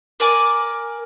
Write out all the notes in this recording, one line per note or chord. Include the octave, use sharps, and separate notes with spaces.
A#4 D5 G#5 D6